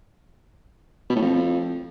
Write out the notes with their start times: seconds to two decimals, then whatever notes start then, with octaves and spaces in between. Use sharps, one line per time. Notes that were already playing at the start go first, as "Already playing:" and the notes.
1.10 B2
1.16 A2
1.21 F2